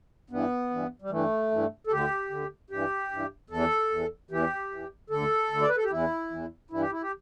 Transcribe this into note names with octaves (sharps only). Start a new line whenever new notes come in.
G2 E3 B3
G2 E3
G3
G2 E3 A3
G2 E3
A4
D2 D3 G4
D2 D3
G2 E3 G4
G2 E3
E2 E3 A4
E2 E3
E2 E3 G4
E2 E3
D2 D3 A4
D2 D3
D5
B4
A4
G4
E2 E3 E4
E2 E3
G2 E3 E4
G4
E4
G4